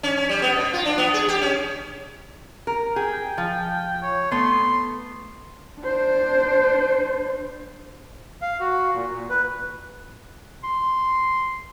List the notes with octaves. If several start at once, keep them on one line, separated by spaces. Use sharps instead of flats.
C#4
C#4
G3
B3
B2
F4
D4
B3
G#4
G4
C#4
A#4
G#4 G5
F3
C#5
A3 B3 C6
D4 C5
F5
F#4
A#2
A#2
B4
C6